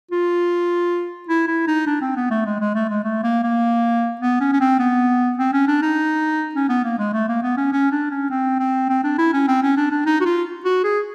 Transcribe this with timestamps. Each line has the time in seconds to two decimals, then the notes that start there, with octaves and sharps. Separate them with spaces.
0.11 F4
1.28 E4
1.48 E4
1.68 D#4
1.87 D4
2.01 C4
2.16 B3
2.30 A3
2.46 G#3
2.60 G#3
2.75 A3
2.90 G#3
3.04 A3
3.23 A#3
3.43 A#3
4.21 B3
4.41 C#4
4.52 C#4
4.60 C4
4.79 B3
5.38 C4
5.53 C#4
5.67 D4
5.82 D#4
6.55 C#4
6.69 B3
6.85 A#3
6.99 G#3
7.13 A3
7.28 A#3
7.43 B3
7.57 C#4
7.72 C#4
7.91 D4
8.11 C#4
8.30 C4
8.59 C4
8.89 C4
9.04 D4
9.18 E4
9.33 C#4
9.48 C4
9.62 C#4
9.77 D4
9.91 D4
10.06 D#4
10.21 F#4
10.26 F4
10.65 F#4
10.84 G#4